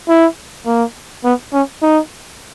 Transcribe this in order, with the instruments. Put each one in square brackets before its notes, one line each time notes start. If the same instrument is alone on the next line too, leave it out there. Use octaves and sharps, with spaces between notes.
[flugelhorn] E4
A#3
B3
C#4
D#4